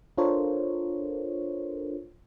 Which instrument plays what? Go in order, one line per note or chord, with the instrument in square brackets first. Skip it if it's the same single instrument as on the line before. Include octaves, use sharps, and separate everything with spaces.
[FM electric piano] D4 F4 A4 A#4 C5 C#5